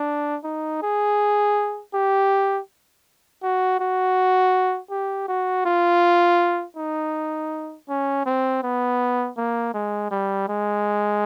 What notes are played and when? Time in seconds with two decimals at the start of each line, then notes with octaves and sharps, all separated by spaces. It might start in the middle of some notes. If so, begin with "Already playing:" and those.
Already playing: D4
0.44 D#4
0.82 G#4
1.94 G4
3.43 F#4
3.79 F#4
4.90 G4
5.28 F#4
5.65 F4
6.77 D#4
7.89 C#4
8.26 C4
8.63 B3
9.37 A#3
9.74 G#3
10.11 G3
10.48 G#3